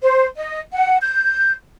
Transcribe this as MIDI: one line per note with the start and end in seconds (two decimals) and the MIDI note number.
0.03 0.25 72
0.36 0.60 75
0.73 0.97 78
1.01 1.51 91